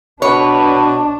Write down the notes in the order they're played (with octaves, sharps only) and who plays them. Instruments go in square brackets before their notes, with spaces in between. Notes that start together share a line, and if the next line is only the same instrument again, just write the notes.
[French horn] B2 [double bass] D4 [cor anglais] B4 [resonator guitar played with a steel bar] C#5